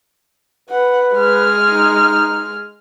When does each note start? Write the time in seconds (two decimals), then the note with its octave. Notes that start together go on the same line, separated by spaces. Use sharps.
0.70 B4 F#5
1.14 G#3 F6
1.64 D#4